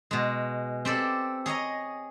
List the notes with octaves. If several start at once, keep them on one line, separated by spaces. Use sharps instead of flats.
B2 G#3
C4 G4 A4 D5
G#4 C#5 D#5 A#5